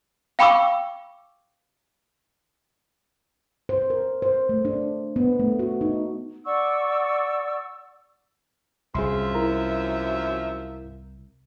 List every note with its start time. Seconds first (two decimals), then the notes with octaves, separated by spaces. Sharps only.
0.39 F5 G5 B5 C#6 D6 E6
3.69 C5
3.90 A#4
4.22 C5
4.49 A3
4.65 D4
5.16 B3
5.39 A3
5.59 F#4
5.81 D#4
6.46 D5 F#5 C#6 E6
8.95 C2 F#2 F3 G#4 E5 C6
9.35 E4 A#4 A#5